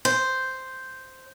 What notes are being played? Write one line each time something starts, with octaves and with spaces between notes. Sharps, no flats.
C5